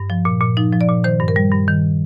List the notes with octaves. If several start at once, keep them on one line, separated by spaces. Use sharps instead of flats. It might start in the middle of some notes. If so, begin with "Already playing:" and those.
Already playing: G2
F3
A#2
A#2
F3 D#4
F3
D5
A#2
D#3 C5
G2
A#4
G3
G2
D#3